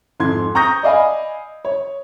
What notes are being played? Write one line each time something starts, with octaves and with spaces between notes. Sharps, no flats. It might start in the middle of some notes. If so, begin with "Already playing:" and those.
F2 G#2 C6 G#6
A#5 C#6 D#6 G6 A#6
D5 D#5 F5 G#5 B5
C#5